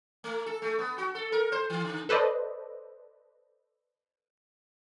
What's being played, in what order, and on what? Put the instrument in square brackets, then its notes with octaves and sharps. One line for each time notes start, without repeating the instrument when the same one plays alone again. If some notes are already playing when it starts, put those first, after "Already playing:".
[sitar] A3
A4
A3
B3
F#4
A4
A#4
C5
E3
D3
[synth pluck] A4 B4 C5 D5 D#5